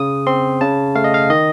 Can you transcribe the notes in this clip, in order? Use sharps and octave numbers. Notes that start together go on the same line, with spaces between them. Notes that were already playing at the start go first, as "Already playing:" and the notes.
Already playing: C#3 D#6
C4 C6
C#3 A5
A3 F5
D#5
F5
D#3 D#5